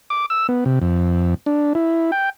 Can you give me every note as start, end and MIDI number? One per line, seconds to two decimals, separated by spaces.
0.10 0.26 86
0.30 0.47 88
0.49 0.64 59
0.66 0.79 48
0.81 1.34 41
1.46 1.73 62
1.75 2.11 64
2.12 2.30 79